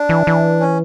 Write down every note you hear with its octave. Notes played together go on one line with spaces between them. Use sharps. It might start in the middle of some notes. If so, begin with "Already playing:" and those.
Already playing: D4
E3
E3
C#4